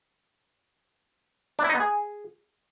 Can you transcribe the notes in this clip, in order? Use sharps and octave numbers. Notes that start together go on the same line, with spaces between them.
D4
E4
D#4
B3
G#4